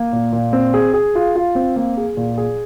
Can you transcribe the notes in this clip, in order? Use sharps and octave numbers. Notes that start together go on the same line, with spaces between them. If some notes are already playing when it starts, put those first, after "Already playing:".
Already playing: A#3
A#2
A#2
C4
G#4
G#4
F4
F4
C4
A#3
G#4
A#2
G#4